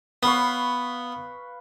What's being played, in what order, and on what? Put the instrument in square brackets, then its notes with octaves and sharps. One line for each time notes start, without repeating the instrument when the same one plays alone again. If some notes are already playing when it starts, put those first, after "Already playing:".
[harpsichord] B3 [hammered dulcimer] B4 F5 C#6